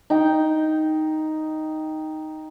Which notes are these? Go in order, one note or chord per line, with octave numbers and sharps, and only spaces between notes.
D#4 G5